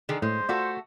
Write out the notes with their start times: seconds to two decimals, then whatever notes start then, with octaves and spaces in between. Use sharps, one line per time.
0.09 D3 D#3 G#4
0.22 A2 G#3 C5
0.49 A3 F4 F#4 A4 D5